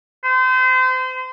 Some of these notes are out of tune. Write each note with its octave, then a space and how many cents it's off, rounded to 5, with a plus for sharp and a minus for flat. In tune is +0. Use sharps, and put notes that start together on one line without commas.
C5 -35